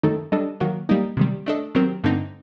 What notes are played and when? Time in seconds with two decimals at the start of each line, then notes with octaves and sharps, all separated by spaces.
0.03 F#2 D#3 A3 D#4 A4
0.32 G3 D4 A4 D#5
0.60 D#3 F#3 A#3 F#4
0.89 G3 A#3 D#4
1.17 C3 D#3 G3
1.46 A3 D4 A4 D#5
1.75 D#3 F#3 C4 G4 A#4
2.04 G2 D3 A3 C4 D#4